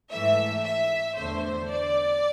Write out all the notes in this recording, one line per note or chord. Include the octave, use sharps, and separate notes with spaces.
G#2 E3 A3 E5
E5
E2 D3 A3 C5
D5